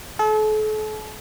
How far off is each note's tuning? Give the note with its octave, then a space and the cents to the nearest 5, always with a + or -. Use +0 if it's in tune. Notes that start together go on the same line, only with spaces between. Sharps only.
A4 -40